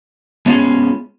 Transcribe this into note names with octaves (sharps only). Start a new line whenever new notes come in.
G#3 B3 C#4 F4 G#4